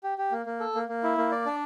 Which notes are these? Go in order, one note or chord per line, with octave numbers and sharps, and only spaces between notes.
G4
G4
A#3
A#3
A4
A#3
A#3
E4
A#3
D5
D4